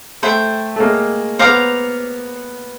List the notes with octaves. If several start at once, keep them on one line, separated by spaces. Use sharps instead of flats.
A3 C5 E5 G5
A3
G#3 A#3
B3 C5 F5 A#5 D6